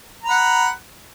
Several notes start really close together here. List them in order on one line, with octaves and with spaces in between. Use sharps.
A#5 B5 F#5